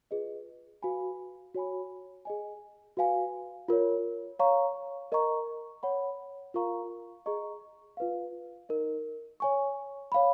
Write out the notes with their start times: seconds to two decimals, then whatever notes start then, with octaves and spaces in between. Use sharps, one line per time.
0.11 F4 G#4 B4 D#5
0.82 F#4 B4 F5 G#5 B5
1.55 F#4 C#5 G#5 B5
2.25 G#4 D#5 G#5
2.97 F#4 B4 F5 G#5
3.68 F4 A#4 C#5
4.39 C#5 F5 A#5 C#6
5.12 A#4 D#5 A#5 C#6
5.83 C#5 F#5 B5
6.54 F4 A#4 F5 A#5 C#6
7.26 G#4 D#5 A#5 C#6
7.97 F4 B4 F5
8.69 D#4 A#4 D#5
9.40 C#5 G#5 C#6
10.12 C#5 F5 B5